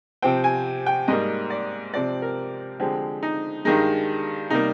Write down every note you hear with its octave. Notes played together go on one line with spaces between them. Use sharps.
C3 F3 C4 G5
G#5
G5
G#2 G3 A#3 D#5
D5
C3 F3 C4 D5
A#4
D3 F3 G#3 C4 G4
D#4
G2 D#3 G#3 D#4
C3 G3 A#3 D#4